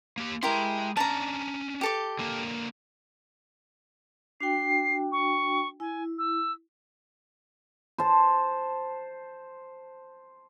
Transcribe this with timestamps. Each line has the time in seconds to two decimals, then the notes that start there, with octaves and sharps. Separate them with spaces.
0.18 A#3 G4
0.43 G#3 E4 G4 A#4 C6
0.97 C#4 D4 A5 A#5
1.81 G4 A4 D6
2.19 D3 A#3
4.41 D4 F#4 G5 C7
5.12 C#6
5.80 E4 G#5
6.18 E6
7.98 C5 A5